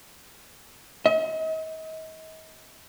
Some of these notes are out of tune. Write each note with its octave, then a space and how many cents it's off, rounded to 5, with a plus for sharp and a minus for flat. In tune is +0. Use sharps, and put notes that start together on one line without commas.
D#5 +40